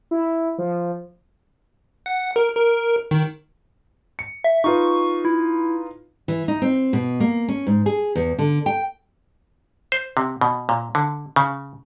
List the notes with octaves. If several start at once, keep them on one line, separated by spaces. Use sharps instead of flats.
E4
F3
F#5
A#4
A#4
D#3
C#7
E5
D#4 F4 B4 C#6
E4
E3
D#4
C4
B2
A#3
C#4
G#2
G#4
E2
D3
G5
C5
C3
B2
A#2
D3
C#3